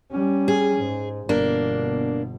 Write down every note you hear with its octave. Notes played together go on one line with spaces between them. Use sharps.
G3 C#4
G#4
G#2
G1 B2 A#3 D4